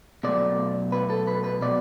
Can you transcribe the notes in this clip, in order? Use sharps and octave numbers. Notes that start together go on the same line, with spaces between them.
B2 F#3 A3 D5
B4
A4
B4
B4
B2 F#3 D5